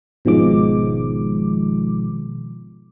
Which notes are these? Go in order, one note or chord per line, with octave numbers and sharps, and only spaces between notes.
G#1 B2 D#3 F3 G#3 D6